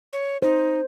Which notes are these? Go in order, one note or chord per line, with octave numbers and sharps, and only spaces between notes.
C#5
D#4 C5